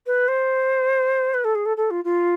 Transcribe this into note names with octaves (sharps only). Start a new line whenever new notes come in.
B4
C5
B4
A4
G#4
A4
A4
F4
F4